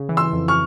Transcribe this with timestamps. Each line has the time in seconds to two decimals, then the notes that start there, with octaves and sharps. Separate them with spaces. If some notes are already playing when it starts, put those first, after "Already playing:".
Already playing: C#3
0.09 E3
0.17 C6 E6
0.33 F2
0.48 C#6 F6